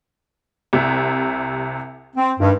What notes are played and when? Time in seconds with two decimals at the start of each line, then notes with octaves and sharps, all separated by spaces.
0.73 C2 C3 E5
2.16 C4
2.40 G2 D#3 G#3